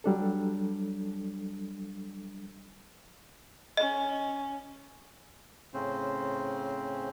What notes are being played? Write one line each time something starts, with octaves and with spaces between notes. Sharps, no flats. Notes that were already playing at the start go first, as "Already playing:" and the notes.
F#3 G3 D4 A4
C#4 D#5
A2 C#3 C4 C#4 C5